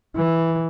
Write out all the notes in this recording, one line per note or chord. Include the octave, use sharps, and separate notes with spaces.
E3